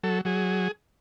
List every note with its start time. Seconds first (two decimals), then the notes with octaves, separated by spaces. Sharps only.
0.03 F#3 A4
0.25 F#3 G#4